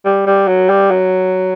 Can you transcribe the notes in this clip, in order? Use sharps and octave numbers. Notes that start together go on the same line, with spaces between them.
G3
G3
F#3
G3
F#3